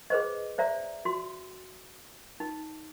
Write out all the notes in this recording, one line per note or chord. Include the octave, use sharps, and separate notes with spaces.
G#4 B4 C5 D#5
C5 D5 E5 A#5
F#4 C6
D#4